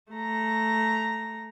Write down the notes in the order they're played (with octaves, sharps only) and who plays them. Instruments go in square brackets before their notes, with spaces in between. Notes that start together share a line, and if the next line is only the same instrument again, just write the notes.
[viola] A3 A#5